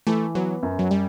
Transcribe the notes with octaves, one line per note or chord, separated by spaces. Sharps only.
E3 A3
F#3 B3
F#2
F#3
G3